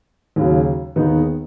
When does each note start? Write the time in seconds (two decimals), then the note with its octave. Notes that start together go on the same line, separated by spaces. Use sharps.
0.36 D#2 C#3 F#3
0.96 D#2 D#3 B3 D#4 G#4